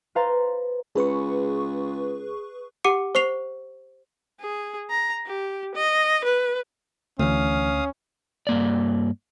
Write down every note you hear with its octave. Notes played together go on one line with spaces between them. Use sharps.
B4 C5 F5 A#5 C6 A6
C#2 G#4 B4 C#6
G4 F#5 D6 C#7
C5 C#6 C7 F7
G#4
A#5
G4
D#5
B4
D2 E3 A3 C#4 F5 D#6
G2 A#3 D5